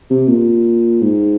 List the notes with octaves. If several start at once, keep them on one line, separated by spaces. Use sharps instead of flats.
C3
A#2
G#2